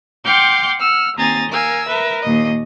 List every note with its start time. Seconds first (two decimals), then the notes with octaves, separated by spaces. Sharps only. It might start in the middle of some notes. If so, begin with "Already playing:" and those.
0.25 F#5 G5 C6 D6 F6 G6
0.80 F#5 E6 F6
1.18 D#2 C4 G#5 A#5 D#6 A6
1.50 A#4 F5 G#5 E6
1.88 A#4 B4 E5
2.22 D#2 A#2 D#5